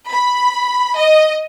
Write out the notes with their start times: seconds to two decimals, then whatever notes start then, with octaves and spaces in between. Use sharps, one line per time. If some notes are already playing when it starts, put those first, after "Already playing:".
0.10 B5
0.96 D#5